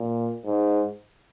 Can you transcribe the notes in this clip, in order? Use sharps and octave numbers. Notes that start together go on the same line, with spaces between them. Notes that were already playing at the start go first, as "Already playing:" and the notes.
Already playing: A#2
G#2